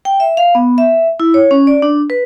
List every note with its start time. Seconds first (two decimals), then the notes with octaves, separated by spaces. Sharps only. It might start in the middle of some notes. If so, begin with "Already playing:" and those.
0.05 G5
0.20 E5
0.37 F5
0.55 B3
0.78 E5
1.20 E4
1.34 C#5
1.51 C#4
1.67 D5
1.82 D4
2.10 B4